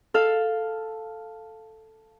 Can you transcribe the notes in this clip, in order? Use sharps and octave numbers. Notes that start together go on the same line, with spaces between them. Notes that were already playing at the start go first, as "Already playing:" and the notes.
A4 F5